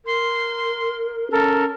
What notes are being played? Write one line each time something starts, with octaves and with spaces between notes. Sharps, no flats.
A#4 C6
C#4 A4 A#4